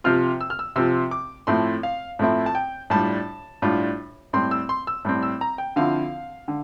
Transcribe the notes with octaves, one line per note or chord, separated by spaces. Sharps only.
C3 F3 C4 F4 F6
E6
F6
E6
C3 F3 C4 F4 E6
D6
A2 F3 A3 C4 E4 C6
F5
A2 F3 A3 C4 E4
A5
G5
A2 G3 D4 F4 A5
A2 G3 D4 F4
A2 G3 C4 C6
E6
C6
E6
A2 G3 C4
E6
A#5
G5
D3 F3 C4 E4 F5
D3